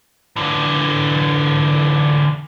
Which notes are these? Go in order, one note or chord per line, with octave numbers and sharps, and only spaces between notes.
D3 E3